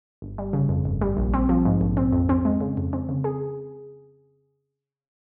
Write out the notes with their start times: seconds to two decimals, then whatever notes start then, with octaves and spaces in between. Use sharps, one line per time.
0.22 G1
0.38 G3
0.53 C#3
0.69 F2
0.85 G1
1.01 G3
1.17 A#1
1.33 C4
1.49 F3
1.65 G#2
1.81 A#1
1.97 C4
2.13 F2
2.29 C4
2.45 G#3
2.61 C#3
2.77 F2
2.93 C4
3.09 C#3
3.24 G#4